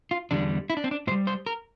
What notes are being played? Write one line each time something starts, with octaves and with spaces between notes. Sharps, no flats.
F4
E2 D3 G3 D4
E4
D4
C4
D4
A2 C5
G3
C5
A#4